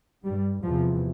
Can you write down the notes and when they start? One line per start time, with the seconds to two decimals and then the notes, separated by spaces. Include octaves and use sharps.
0.23 G2 G3
0.64 E2 C3 F3